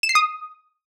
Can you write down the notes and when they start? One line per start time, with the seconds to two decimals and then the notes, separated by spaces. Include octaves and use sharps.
0.03 E7
0.09 C7
0.15 D#6